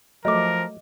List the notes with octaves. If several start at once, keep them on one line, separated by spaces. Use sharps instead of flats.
F3 F#3 A3 A#4 D#5 D6